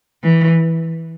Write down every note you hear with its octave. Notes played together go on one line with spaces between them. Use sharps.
E3